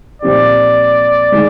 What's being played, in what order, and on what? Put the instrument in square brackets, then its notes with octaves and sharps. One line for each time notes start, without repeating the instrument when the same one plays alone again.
[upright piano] A#2 F3 C4 D#4 G4 [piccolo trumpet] D5
[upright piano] D#3 G#3 D#4